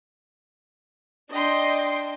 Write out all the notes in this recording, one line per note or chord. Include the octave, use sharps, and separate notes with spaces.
D4 D#5 G5 C6